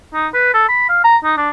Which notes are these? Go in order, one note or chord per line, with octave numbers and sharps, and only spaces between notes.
D#4
B4
A4
B5
F5
A#5
D#4
D4